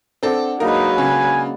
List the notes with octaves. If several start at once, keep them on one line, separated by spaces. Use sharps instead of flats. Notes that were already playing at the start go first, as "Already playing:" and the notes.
C4 D4 A4 D5 F#5
F#3 G#3 A#3 D#4 A#4 B4
C#3 F#5 G#5